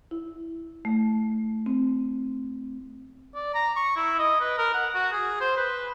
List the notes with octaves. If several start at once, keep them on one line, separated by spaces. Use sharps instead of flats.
E4
A3
C4
D5
A#5
C#6
E4
D#5
B4
A#4
F#5
F#4
G#4
C5
B4